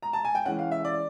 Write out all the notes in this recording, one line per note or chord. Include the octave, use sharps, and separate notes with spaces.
A#5
A5
G#5
G5
E3 G#3 C#4 F#5
F5
E5
D5